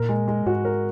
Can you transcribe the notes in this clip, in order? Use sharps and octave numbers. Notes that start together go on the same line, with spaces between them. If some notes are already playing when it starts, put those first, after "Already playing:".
Already playing: A#2 A#4
G#3
G#3
G#2 F#4
A#4